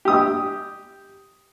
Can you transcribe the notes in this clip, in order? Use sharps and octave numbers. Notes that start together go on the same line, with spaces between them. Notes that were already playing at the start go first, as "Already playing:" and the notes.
G4 D#6